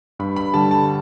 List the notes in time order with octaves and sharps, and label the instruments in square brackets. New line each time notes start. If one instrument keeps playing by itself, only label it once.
[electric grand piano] G2 [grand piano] B5
[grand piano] B5
[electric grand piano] D3 G3 [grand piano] A5
[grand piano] A5